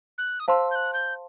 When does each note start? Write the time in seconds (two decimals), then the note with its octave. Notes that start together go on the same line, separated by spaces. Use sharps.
0.18 F#6
0.40 D#6
0.48 C5 F5 A5 C6 E6
0.71 G6
0.75 F#6
0.93 G6